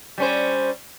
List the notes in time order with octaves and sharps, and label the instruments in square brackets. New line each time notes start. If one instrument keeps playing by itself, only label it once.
[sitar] G3 C#4 C5